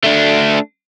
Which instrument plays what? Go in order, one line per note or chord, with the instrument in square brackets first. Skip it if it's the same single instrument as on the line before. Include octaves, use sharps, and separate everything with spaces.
[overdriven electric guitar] A3 D4